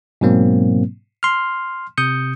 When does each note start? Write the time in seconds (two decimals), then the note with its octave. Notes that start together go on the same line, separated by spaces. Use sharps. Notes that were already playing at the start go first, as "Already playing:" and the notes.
0.21 G#2 B2 F#3 A#3 C4
1.23 C6 F6
1.98 C3 D#6 G6 C#7